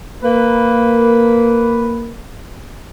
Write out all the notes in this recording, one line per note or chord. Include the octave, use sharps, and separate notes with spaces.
A#3 B4